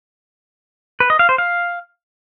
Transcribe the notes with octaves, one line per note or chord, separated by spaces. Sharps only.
B4
D#5
F5
C5
F5